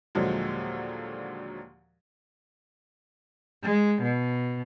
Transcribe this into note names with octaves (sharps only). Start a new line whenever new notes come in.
D#2 A#2 D3 F3 F#3 G#3
G#3
B2